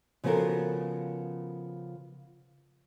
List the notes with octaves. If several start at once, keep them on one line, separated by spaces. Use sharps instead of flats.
C#3 F3 B3 F#4 A4 A#4